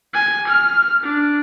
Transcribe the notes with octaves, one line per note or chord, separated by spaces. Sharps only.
G#5
F6
D4